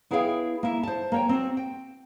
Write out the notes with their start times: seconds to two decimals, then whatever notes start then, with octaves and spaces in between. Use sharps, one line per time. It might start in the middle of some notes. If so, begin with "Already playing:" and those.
0.11 B3 E4 G#4 C#5 F5 G5
0.63 A#3 E4
0.83 C5 A5
1.12 A#3 C#5 G5
1.29 C4 F#4
1.57 G5